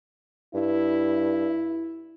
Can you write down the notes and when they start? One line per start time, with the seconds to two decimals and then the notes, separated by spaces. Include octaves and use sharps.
0.54 G2 E4